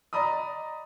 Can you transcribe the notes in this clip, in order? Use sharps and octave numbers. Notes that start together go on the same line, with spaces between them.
D5 D#5 A#5 B5 D#6